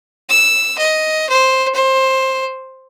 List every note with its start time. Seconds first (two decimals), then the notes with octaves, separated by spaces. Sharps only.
0.29 E6
0.78 D#5
1.29 C5
1.75 C5